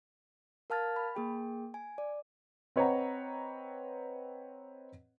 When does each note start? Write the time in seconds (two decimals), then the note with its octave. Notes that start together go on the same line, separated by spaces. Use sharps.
0.70 A#4 F5 A5 F6 G#6 A6
0.96 B5
1.15 A#3 G#4 G5
1.74 G#5
1.98 D5
2.76 C4 B4 C#5 D#5 F#5 A#5